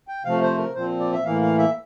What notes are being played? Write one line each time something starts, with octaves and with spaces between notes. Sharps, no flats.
G5
C3 F3 A3 F5
C5
A#4
A#2 F3 C4 C5
D5
E5
A2 E3 A#3 F5
F5
E5